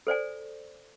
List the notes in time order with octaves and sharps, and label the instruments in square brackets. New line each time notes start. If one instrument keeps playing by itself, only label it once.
[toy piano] A4 C5 D5 G#5